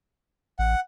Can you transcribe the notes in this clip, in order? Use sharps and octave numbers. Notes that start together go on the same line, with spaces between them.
A1 F#5